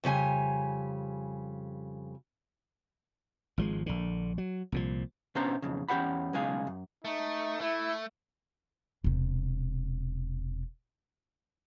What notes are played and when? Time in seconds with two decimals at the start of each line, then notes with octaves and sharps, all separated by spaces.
0.04 F2 C#3 G3 G#5
3.58 G#1 F3 G#3
3.86 A#1 D3
4.38 F#3
4.72 C2 A#2 F3
5.35 B2 B3 C#4 D4 C5 A#5
5.62 B1 F2 C#3
5.88 E2 C#4 G4 C5 F#5 B5
6.33 B1 C#3 G#3 G#4 F5
6.67 F#2
7.05 A3 D#4
7.61 A3 E4
9.04 E1 C3